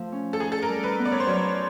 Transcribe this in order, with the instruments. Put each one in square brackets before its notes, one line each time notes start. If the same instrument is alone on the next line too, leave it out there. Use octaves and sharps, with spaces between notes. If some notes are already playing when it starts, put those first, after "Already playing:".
Already playing: [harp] F3 A3
C#4
[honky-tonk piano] A4
[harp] D#4 [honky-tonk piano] G#4
[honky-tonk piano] A4
A#4
[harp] G3
[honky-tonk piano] B4
[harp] B3
[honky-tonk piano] D5
C#5
C5
[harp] F#3 [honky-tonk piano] C#5